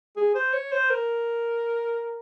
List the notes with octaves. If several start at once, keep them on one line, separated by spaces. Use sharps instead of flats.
G#4
C5
C#5
C5
A#4